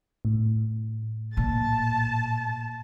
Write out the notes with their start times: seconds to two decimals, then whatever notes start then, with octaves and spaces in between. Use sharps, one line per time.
0.25 A2
1.37 A#2 A5